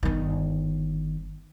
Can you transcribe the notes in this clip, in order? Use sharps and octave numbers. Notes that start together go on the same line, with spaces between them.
G1 D#3